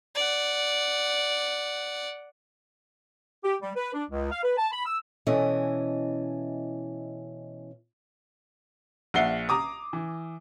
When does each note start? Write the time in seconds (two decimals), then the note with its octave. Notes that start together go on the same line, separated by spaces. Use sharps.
0.15 D5 F#5
3.44 G4
3.62 G3
3.76 B4
3.94 D4
4.11 C#2
4.31 F5
4.43 B4
4.57 A5
4.71 B5
4.85 E6
5.27 B2 E3 C#4 E4 A4 D#5
9.14 A#1 E5 F#5 C7 G7
9.49 A#5 D6 D#6
9.93 E3